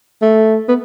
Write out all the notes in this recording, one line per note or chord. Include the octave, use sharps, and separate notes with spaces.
A3
B3